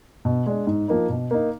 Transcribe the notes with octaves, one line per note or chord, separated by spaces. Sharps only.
B2
G#3 D4
G#2
F3 A#3 D#4
B2
A#3 D#4